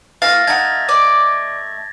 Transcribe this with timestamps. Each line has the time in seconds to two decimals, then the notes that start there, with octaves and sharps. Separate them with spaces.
0.22 E3 A3 F5 A6 A#6
0.47 A3 D#4 F#5 G#6 A6
0.89 D5